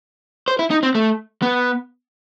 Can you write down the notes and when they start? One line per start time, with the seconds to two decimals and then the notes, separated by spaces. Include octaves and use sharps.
0.48 C5
0.59 E4
0.71 D#4
0.83 C4
0.95 A3
1.42 B3